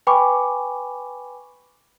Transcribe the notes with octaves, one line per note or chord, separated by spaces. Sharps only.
B4 G5 G#5 B5 C#6 D6